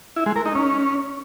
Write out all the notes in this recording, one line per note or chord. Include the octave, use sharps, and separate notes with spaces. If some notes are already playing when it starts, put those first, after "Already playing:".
E4
G#3
A#4
D#4
C#4